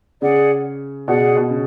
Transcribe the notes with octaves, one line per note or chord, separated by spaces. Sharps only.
C#3 G#4 D5 F#5
B2 G#4 D5 F#5
B2
C#3